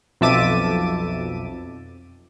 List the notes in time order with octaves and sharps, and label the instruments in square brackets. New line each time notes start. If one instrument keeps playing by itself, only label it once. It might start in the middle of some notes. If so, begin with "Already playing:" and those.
[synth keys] B1 F2 E5 A5 D6 D#7